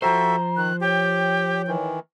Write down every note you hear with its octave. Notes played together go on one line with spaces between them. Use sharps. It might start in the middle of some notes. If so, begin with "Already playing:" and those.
F3 F#4 A4 C5 E5 G5 A#5
D#3 F#6
G4 C#5 G5
D#3 E3